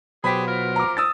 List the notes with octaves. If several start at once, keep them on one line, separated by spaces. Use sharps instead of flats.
B2 F#3 G4 G#4 C5 B5 B6
F4 A#4 C5
A#5 D6
D#6 E6 A6